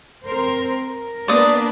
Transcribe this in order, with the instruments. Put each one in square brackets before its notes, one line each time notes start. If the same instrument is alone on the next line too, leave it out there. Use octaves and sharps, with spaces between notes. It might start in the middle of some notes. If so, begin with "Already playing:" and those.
[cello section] C4 A#4 C5
A#4
[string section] A#3 B3 D4 [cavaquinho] D5 D#6